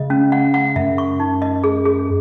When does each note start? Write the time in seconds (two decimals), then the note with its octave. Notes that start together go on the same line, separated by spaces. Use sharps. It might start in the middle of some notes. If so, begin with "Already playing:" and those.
Already playing: C#3 D#5
0.10 C#4
0.32 F#5
0.54 F#5
0.76 F#2 E5
0.98 C#6
1.20 D#4
1.42 D#5
1.64 G#4
1.85 G#4